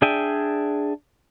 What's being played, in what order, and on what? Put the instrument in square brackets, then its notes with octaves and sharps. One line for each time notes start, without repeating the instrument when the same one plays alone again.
[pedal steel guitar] D4 G#4 E5 G5 G#5